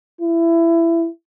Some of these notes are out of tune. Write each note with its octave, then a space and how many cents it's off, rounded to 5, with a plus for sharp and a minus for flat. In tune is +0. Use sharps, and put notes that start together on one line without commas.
E4 +20